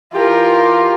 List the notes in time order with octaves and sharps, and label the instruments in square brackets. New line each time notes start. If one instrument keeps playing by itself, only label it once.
[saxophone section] E3 G4 [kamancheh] F4 A#4